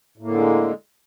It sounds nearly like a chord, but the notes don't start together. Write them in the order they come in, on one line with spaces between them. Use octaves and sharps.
A2 A#3 D3 G#3